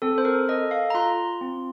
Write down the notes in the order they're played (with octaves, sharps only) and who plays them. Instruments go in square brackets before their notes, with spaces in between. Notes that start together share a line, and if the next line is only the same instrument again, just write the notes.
[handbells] C4 A4
C5
A#4
A4 D#5
F5
A#5
F4 C6
C4